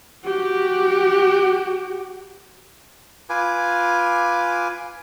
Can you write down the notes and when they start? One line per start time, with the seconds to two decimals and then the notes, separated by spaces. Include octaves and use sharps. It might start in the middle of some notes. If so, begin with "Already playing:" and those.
0.24 F#4 G4
3.30 F4 B4 G#5 D6